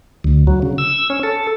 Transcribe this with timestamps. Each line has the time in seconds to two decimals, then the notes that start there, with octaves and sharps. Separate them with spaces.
0.24 D2
0.47 F#3
0.62 C#3
0.78 E6
1.10 C#4
1.23 A4